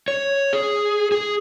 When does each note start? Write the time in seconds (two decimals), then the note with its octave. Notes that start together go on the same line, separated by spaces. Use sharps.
0.08 C#5
0.53 G#4
1.12 G#4